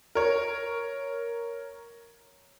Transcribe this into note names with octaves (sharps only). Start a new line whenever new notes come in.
A#4 C#5